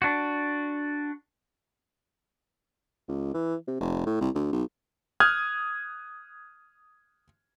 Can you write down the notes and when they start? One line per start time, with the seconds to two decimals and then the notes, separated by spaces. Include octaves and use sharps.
0.02 D4 F#4
3.08 C#2
3.34 E3
3.67 C3
3.80 F1
4.06 A2
4.21 C2
4.35 D2
4.52 B1
5.20 D#6 F6 F#6 G#6